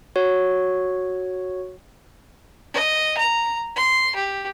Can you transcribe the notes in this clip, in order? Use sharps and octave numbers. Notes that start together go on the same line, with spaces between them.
F#4 C#5
D#5
A#5
C6
G4